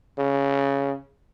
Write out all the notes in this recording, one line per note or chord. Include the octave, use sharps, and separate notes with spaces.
C#3